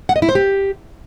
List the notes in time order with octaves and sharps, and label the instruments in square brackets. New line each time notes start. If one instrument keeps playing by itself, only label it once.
[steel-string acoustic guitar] F#5
D#5
E4
C5
G4